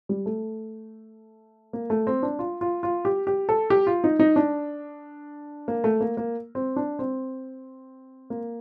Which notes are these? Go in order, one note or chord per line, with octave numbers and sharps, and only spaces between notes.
G3
A3
A#3
A3
C4
D4
F4
F4
F4
G4
G4
A4
G4
F4
D#4
D#4
D4
A#3
A3
A#3
A#3
C4
D4
C4
A#3